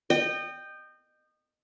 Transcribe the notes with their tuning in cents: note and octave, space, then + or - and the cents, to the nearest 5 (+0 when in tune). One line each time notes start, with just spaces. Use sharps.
D#5 -30 G5 +0